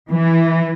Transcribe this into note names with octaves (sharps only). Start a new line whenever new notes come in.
E3